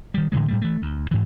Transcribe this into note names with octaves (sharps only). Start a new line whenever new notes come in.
D#3 G3
A2 D3 E3 G#3
A2 G3 A3
E3 A3
D2
G#2 E3